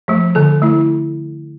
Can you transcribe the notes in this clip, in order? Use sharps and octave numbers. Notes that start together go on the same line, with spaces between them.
F3 A3
D3 A4
A3 E4